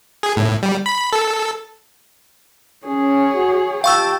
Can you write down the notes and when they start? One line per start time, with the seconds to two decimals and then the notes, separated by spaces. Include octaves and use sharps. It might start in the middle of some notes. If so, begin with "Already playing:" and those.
0.23 G#4
0.36 A2
0.63 G3
0.86 B5
1.13 A4
2.86 C#4 G#4 C#5
3.34 F#4
3.84 F2 F4 G4 F5 G5 A5 C#6 E6